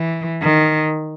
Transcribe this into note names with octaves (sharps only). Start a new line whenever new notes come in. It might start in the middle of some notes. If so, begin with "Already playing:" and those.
Already playing: E3
D#3